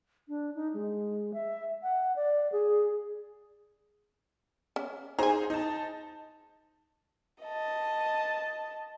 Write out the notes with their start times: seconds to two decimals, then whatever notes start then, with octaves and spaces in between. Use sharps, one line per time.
0.28 D4
0.55 D#4
0.74 G#3
1.34 E5
1.83 F#5
2.16 D5
2.52 G#4
4.76 C#4
5.19 D#4 G#4 C5 G#5 A#5
5.50 D#4 A5
7.43 D#5 A5